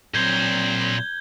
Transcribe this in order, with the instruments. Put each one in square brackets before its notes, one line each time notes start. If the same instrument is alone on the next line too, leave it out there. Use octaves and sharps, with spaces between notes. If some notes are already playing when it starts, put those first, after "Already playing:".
[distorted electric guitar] A#2 C5 [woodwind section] F#3 C4 [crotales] G6 G#6 G7